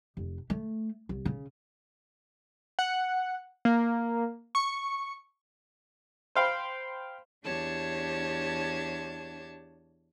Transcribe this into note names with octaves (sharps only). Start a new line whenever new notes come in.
F1
A3
C2
C#3
F#5
A#3
C#6
C5 F5 G5 B5
E2 D4 G4 C#5 A5 G#6